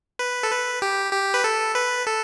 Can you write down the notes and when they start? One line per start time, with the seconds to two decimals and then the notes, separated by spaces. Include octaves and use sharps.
0.19 B4
0.43 A4
0.51 B4
0.82 G4
1.13 G4
1.34 B4
1.44 A4
1.75 B4
2.07 A4